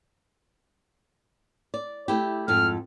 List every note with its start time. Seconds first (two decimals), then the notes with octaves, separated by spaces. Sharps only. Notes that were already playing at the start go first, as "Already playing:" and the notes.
1.74 D5
2.08 A3 E4 G4
2.48 F2 G#2 A4 F6